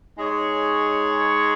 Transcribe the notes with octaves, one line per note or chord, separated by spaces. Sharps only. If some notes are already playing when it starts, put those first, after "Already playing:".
G#3 D#4 G#4 C#5